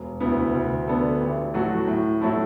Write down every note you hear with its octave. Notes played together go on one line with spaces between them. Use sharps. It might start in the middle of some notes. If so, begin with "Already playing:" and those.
Already playing: E1
D2 D3 B3 E4
D2
D3 B3 D4 A4
A1
A2 F#3 A3 F#4
A2
F#3 A3 E4 A4